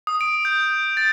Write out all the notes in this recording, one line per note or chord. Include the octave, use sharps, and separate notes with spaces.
D#6
D7
G6
A6